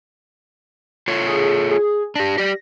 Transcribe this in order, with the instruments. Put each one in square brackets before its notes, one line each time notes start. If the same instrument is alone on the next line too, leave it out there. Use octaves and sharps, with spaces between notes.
[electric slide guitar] F4 A4 C#5
[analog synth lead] G#4
G#4
[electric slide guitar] D4 G4 [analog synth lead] A#6
[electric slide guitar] G4 D5